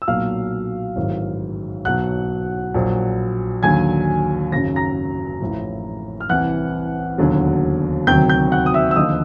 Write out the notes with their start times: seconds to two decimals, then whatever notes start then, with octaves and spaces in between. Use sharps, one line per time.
0.02 E6
0.08 B1 A#2 F#3 F5 F6
0.96 A1 G#2 D#3 F#3
1.85 B1 B2 F#3 F#5 F#6
2.74 A#1 A#2 F#3
3.63 D#2 D3 F#3 G#5 G#6
4.52 G#1 F#2 C#3 F#3 A#6
4.76 A#5 A#6
5.41 A1 A2 F3
6.20 F6
6.30 C2 C3 E3 F#5 F#6
7.18 E1 D#2 D3 F#3
8.07 D2 C3 D#3 F#3 G5 G6
8.29 G5 G6
8.52 F#5 F#6
8.66 D#6
8.74 E5 E6
8.91 E6
8.96 D#2 D3 F3 D#5 D#6